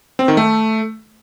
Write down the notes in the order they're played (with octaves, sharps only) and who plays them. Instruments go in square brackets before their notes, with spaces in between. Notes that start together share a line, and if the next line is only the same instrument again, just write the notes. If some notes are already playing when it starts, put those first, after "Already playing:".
[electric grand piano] C4
D#3
A3